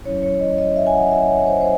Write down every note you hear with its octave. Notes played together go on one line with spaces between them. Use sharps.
F#3 C#4 E4 C#5
C#5
D#5
D#5
E5
G#5
F#5
E5
C#5
C5
C#5
C5